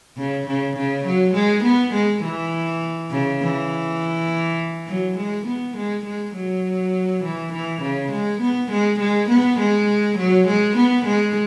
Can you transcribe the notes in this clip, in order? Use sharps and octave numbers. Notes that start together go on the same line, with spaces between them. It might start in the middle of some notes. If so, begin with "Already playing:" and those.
C#3
C#3
C#3
F#3
G#3
B3
G#3
E3
C#3
E3
F#3
G#3
B3
G#3
G#3
F#3
E3
E3
C#3
G#3
B3
G#3
G#3
B3
G#3
F#3
G#3
B3
G#3